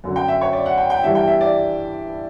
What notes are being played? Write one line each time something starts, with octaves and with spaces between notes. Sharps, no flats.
F#2 D3 F#3
G5
E5
C#5
D5
F#5
G5
G5
G2 E3 G3 D4 E5
G5
E5
D5